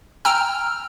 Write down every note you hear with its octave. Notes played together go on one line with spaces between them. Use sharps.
G5 A#5 E6 F6